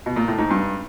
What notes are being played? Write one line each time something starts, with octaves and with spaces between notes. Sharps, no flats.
B2
A#2
A2
G#2
G2